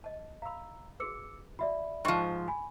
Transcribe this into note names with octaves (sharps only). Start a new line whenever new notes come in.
D#5 A5
F5 A#5 B5 E6
F#4 G#4 B4 D6 E6 C#7
F#4 D5 E5 B5
G#2 F3 G5 C6 C#6
G#5 B5